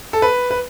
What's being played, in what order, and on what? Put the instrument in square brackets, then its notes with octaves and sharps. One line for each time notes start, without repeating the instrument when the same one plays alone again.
[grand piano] A4
B4
B4